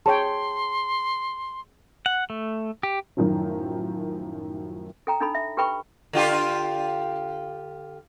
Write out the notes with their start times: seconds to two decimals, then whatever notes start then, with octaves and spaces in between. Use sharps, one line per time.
0.06 G#4 C#5 G5 A5 C6
2.06 F#5
2.30 A3
2.83 G4
3.17 F#2 A2 D#3 F3 F#3
5.07 A4 G5 A#5
5.20 D4 D#4 A4 B5
5.35 E5
5.57 G4 A4 B4 G5 B5 C#6
6.13 D3 F4 G4